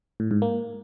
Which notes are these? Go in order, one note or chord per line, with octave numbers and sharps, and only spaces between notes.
A2
G#2
A#3